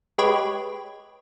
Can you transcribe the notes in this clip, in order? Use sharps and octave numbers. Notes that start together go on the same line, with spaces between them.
G#3 G4 B4 C#5